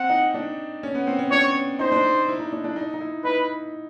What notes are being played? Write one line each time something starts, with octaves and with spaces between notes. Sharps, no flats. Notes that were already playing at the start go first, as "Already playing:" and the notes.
Already playing: C4 F#5
D#4
D4
C#4
B3
C4
C#4
D4 C#5
D#4 C5
D4
D#4
E4
D#4
D4
D4
D#4
D#4
E4
D#4 B4